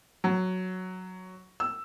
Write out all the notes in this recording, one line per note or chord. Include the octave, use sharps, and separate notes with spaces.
F#3
E6